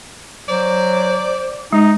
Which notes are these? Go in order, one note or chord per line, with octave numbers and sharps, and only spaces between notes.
F#3 C5 D5
G#3 D#4